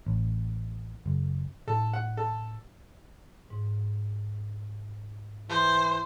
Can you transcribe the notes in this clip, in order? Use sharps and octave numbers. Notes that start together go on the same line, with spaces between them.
A1
F#1
A2 A4
F#5
A4
G#2
E3 C5